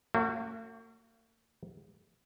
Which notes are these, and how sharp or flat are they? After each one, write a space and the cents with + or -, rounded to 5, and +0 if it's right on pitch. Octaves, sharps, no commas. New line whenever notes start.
A#3 -45 C#4 +0 F#4 +0